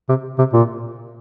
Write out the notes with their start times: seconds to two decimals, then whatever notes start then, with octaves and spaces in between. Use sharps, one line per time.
0.09 C3
0.38 C3
0.53 A#2